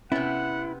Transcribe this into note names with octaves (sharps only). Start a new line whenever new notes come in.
C3 B3 C#4 E4 F#5